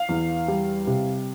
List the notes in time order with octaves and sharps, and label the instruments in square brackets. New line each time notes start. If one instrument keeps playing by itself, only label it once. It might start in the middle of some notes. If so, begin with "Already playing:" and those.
Already playing: [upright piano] F5
E2
G3
C3